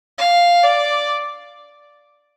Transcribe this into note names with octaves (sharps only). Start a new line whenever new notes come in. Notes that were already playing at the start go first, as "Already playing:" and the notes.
F5
D5